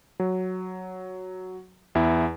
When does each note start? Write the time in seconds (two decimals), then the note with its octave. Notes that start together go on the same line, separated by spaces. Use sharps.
0.20 F#3
1.95 E2 E4